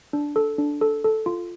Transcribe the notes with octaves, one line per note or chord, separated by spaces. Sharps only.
D4
A4
D4
A4
A4
F4